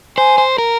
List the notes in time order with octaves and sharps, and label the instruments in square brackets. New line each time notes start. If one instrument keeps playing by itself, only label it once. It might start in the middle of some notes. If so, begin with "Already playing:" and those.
[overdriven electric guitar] C5 [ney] G#5
[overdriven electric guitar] C5
A#4